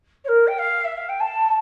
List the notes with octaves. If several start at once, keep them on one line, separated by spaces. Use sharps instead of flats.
C#5
A#4
G5
F5
E5
F5
G5
A5